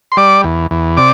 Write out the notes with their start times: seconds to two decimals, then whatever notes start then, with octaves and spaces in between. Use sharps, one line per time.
0.12 C6
0.17 G3 D5 D6
0.44 E2
0.71 E2
0.97 C3 D5 D6